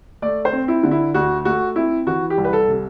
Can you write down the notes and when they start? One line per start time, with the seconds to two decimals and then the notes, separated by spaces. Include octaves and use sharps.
0.22 A3 D5
0.45 C5
0.53 C4
0.68 E4
0.83 D3
0.91 E4
1.14 D2 F#4
1.45 A3 F#4
1.76 C4 E4
2.07 E3 F#4
2.30 G4
2.38 C2
2.45 B4
2.53 A4
2.68 C3